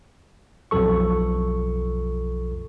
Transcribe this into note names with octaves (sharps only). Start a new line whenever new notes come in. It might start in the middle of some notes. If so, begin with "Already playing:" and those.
B1 F2 F3 A4 C#6